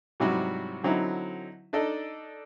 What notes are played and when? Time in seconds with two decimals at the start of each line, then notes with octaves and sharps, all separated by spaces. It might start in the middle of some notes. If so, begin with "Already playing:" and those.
0.20 G#2 C3 F#3 G3 E4 F#4
0.84 D3 F#3 C4 D#4 E4
1.73 D4 D#4 A4 D5 D#5